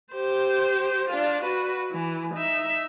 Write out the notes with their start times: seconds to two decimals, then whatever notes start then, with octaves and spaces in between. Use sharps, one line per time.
0.13 G4 C5
1.09 D4 F4
1.42 F#4 B4
1.92 E3
2.34 D#4 E5